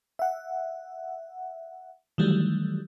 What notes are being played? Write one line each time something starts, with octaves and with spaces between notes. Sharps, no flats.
E5 F#5
D#3 E3 F#3 G3 A3